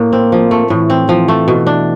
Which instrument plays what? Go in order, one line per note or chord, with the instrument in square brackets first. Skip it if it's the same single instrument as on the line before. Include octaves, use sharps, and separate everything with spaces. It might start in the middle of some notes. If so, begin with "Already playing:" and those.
Already playing: [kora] A2 [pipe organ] A#3
[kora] C4
F3
A3
[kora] A2 [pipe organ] E3
[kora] C4
[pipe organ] E3 [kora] F3
[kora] A3
B2
D4